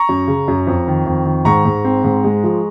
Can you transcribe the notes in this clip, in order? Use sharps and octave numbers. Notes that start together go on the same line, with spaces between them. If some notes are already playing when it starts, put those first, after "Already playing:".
Already playing: A#5 C#6
F#2
C#3
F#2
F2
D#3
F2
D#3
G#2 A#5 C#6
G#2
C4
G#2
G#3
F3